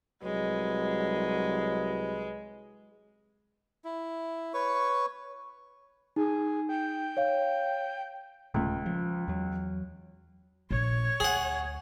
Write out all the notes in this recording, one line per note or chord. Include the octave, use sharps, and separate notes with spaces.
C2 F#3 G#3 B4
E4
B4 C#5 C#6
D#4 G#4
G5
C#5 F5
D#1 C#2 A3
F3
E2 F#3
A#1 C#5
D2 G#4 F#5